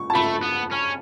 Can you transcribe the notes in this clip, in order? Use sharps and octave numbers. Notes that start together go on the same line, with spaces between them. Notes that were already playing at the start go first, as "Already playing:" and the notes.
Already playing: C#6
A5
A3 B5
B3
C#4